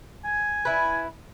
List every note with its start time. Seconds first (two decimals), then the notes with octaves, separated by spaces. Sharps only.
0.25 G#5
0.65 E4 B4